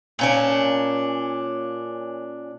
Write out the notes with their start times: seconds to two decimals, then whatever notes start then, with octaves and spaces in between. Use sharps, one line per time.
0.19 A#2 C#4 D4